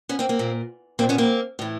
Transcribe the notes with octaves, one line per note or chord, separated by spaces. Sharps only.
B3 C#4
A#3 C4
A#3 C4
A#2
A#2 A#3 C4
B3 C#4
A#3 C4
A2 E3